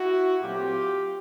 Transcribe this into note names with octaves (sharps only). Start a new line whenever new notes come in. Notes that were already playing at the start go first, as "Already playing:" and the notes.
Already playing: E4 F#4
A#2 F#3 A3 C4 F4 G4